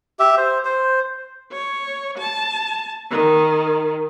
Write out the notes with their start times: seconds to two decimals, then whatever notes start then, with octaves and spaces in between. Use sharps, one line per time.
0.19 G4 E5
0.37 C5
0.65 C5
1.52 C#5
2.18 A5
3.10 D#3